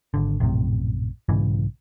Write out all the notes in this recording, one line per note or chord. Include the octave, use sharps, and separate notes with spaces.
G#1 D3
A#1 F#2 A2 C3
B1 G#2 C#3 E3